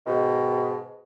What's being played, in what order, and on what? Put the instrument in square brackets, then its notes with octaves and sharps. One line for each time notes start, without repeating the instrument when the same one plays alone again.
[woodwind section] G#2 B2 D#3